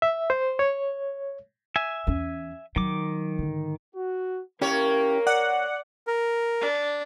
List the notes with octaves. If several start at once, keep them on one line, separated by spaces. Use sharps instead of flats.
E5
C5
C#5
E5 G#5
E2 C#4
D#3 F#3 D6
G#2 D3
F#4
A#3 C#4 E4 G4 A#4 C#5
D5 F#5
A#4
D4